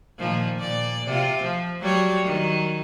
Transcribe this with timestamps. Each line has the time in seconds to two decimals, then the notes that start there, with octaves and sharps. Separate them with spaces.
0.19 A#2 D#3 F3
0.58 A#2 D5
1.07 C3 F4
1.43 F3
1.81 F#3 G3 C#5
2.25 D#3 F#3